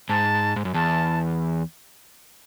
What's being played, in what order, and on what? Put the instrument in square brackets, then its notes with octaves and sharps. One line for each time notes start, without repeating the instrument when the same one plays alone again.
[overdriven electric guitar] G#2 [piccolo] A5
[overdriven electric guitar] G#2
F#2
[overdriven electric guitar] E2 [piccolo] A5